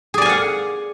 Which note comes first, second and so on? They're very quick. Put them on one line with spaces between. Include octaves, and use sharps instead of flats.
G#4 D5 G#5 F5 F#5